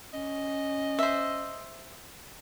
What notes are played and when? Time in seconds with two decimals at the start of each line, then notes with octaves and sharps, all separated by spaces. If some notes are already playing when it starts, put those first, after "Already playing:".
0.14 C#4 D#5
0.99 C5 E5